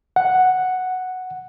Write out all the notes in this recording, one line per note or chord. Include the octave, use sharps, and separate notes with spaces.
F#5